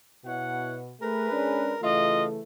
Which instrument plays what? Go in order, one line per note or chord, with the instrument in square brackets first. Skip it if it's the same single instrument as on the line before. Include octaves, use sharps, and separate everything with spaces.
[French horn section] B2 [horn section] E4 C#5 F#5
[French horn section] A3 [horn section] G#4 A#4 B4
[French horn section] G#3 C#4 D4
[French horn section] C#3 E3 A3 [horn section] F4 D#5